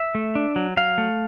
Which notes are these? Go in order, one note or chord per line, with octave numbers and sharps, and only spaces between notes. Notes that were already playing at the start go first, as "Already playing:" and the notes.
Already playing: E5
A3
D4
F#3
F#3 F5
A3